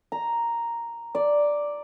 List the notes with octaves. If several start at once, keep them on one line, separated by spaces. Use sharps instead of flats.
A#5
D5